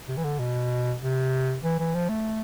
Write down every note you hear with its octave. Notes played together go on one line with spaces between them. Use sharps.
C3
E3
D3
B2
C3
E3
E3
F3
A3